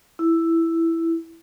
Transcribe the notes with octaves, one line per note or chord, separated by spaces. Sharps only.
E4